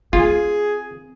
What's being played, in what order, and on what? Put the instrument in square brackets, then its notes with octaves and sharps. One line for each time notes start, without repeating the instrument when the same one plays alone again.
[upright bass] C4 [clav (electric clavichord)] F4 [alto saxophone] G#4